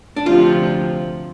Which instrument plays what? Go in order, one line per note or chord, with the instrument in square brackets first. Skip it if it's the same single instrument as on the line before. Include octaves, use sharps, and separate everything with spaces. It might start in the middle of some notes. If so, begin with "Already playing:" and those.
[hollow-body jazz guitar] D4
[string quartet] D2 C3 F3 [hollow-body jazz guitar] F4